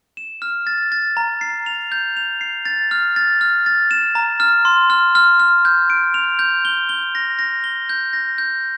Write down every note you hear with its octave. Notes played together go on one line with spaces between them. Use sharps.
E7
F6
A6
A6
A#5
C7
F7
G6
F7
C7
A6
F6
A6
F6
A6
E7
A#5
F6
C6
F6
F6
F6
G6
D7
F7
G6
G7
G7
A#6
A#6
G7
G6
A#6
G6